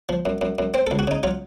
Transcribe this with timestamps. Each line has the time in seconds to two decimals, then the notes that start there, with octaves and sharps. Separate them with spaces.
0.09 F3
0.25 F#2
0.41 F#2
0.59 F#2
0.74 C4 C5
0.87 C#2 A4
0.99 F#4
1.07 C#3 D#4
1.23 F#3 F4